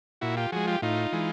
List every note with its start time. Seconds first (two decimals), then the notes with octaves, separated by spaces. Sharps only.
0.21 A#2 E4 F#4
0.37 F4 G4
0.52 F3 G#3 F#4 G#4
0.67 F4 G4
0.82 A2 D#4 F4
1.12 E3 G#3